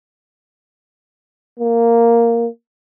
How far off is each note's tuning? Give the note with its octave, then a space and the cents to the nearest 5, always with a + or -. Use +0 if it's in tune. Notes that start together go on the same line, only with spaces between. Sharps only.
A#3 -5